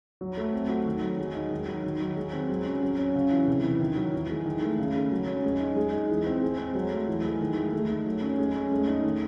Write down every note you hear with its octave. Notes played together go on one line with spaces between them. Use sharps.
F#3
A3
C4
F#4
D#3
F#3
G#3
D#4
D#3
F#3
D#3
F#3
G#3
C4
F#3
C#4
F#3
C#4
C#3
E3
C3
E3
D#3
F#3
E3
G#3
D#3
A3
C#3
G#3
F#3
C#4
G#3
D#4
G#3
D#4
E3
C4
G#3
C4
F#3
A3
E3
G#3
D#3
A3
A3
D#4
F#3
C#4
G#3
C#4
A3
D#4
D#3